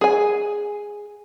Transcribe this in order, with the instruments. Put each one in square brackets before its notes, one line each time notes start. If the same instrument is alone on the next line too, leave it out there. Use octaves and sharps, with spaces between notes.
[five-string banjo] G#4 G#5